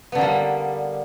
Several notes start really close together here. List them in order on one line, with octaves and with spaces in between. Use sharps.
B3 D3 A#3 G3